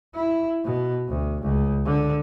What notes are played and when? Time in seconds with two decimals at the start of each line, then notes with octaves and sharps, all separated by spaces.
0.14 E4
0.64 B2
1.08 D2
1.42 C#2
1.86 D3